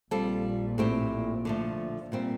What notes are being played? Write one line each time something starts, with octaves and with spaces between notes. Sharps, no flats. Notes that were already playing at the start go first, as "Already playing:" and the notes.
A#1 A#2 G3 C4 F4 A4
A2 A3 C4 G4
D3 F3 A3
A#2 G3 C4